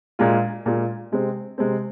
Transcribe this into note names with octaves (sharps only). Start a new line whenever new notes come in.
A#2 G#3 F4
A#2 G#3 F4
C3 G#3 C4
C3 G#3 C4